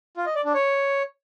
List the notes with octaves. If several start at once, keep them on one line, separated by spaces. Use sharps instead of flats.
F4
D#5
D5
D4
C#5